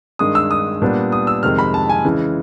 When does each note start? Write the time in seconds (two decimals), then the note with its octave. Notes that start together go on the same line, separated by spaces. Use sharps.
0.19 G2 D#3 G#3 D#6
0.35 E6
0.51 D#6
0.82 A#2 G3 B3 D4
1.12 D#6
1.27 E6
1.43 F2 C3 D#3 G#3 F6
1.59 B5
1.74 A5
1.89 G#5
2.05 C#3 E3 G#3